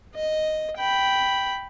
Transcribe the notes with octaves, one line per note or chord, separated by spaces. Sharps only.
D#5
G5 B5